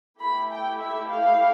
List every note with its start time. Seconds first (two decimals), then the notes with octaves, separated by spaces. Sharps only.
0.21 A3 E4 G4 B5
0.51 G5
0.80 E5
1.09 F5